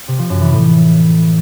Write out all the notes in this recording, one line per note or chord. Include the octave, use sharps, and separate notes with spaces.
C3
F3
F#2
E3
A2